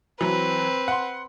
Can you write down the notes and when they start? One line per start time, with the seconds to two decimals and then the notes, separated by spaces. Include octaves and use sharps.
0.21 E3 F#3 C4 B4
0.88 F#5 C6